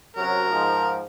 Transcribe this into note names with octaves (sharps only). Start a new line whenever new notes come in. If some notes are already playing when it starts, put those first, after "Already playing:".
F#2 C3 F#3 A#4
G#2 F3